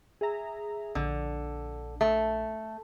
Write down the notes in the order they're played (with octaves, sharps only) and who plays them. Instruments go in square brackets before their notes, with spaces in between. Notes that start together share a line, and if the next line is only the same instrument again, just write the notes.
[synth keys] G#4 E5 A#5
[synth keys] A#1 [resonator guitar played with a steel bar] D3
[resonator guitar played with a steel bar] A3